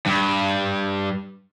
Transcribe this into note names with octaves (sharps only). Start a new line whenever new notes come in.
G2